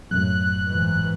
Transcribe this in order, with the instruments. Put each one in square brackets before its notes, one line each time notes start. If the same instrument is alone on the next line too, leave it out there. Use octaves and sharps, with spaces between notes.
[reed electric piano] F#2 A2 [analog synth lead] F#6
[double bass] G#2 E3